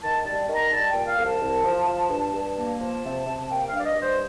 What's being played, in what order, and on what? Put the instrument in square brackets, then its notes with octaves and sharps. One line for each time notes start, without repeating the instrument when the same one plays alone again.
[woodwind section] D#3 A5
A5
G3
D#3
A#5
G3 A5
A#2 G5
F5
C2
A5
C2
F3
F3
G2
G2
A#3
F3 A5
C3
C3
A#3 G5
G2 F5
D5
D#5
G2
C5